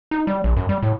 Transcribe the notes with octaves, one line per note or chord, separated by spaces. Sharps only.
D#4
G3
A#1
F#2
G3
A2